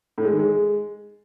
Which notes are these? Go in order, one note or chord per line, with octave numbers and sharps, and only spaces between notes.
A2
G#3
D#3
G#3